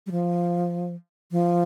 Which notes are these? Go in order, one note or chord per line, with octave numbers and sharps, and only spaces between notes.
G3
F3
F3